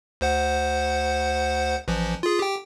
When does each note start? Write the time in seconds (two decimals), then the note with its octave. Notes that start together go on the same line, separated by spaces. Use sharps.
0.21 D2 C5 F#5
1.88 A1 E3 F3
2.23 F4 G#4
2.39 G4 G5